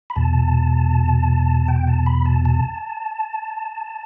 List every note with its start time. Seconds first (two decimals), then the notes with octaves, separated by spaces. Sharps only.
0.10 B5
0.16 E2 B2 A5
1.68 G5
1.87 A5
2.06 B5
2.25 A5
2.45 A5